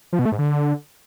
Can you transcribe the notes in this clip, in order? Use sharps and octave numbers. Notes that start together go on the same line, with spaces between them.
F3
B2
A3
G#2
D3